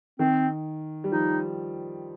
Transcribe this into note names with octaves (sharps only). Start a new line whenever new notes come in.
D#3 C4
G3
F3 D#4